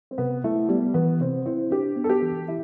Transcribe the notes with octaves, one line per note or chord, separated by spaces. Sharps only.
C4
C3 B3
A3 E4
G3 B3
E3 B3
C3 C4
C4 E4
D4 G4
B3
A4
G4
E3
E4 G4